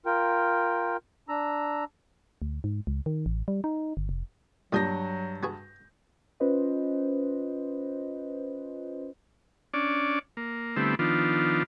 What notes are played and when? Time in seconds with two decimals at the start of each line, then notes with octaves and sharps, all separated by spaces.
0.06 F4 A#4 G5
1.29 D4 A#5 E6
2.42 D2
2.64 G#2
2.87 C#2
3.06 D#3
3.26 A1
3.48 G3
3.64 D#4
3.97 G1
4.09 F1
4.73 G2 A#2 F#3 G3 D#6 G6 A#6
5.43 B3 F#4 G#4
6.40 C#4 F4 B4 C5 D#5
9.74 C#4 D4 D5
10.37 A#3
10.76 D3 G3 A3 B3 C4 E4
10.99 D#3 F3 B3 D4 F4